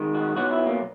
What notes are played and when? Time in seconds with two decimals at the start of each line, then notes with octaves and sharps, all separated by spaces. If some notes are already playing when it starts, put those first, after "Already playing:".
Already playing: G#2 D#3 G#3
0.15 F#4
0.36 B1 B2 F#3 F#4
0.51 E4
0.67 A#3